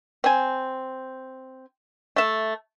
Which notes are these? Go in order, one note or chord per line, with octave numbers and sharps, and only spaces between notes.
C4 G#5
A3 E5